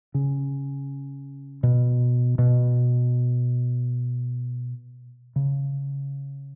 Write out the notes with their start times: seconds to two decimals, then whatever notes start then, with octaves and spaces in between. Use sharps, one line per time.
0.14 C#3
1.63 B2
2.38 B2
5.36 C#3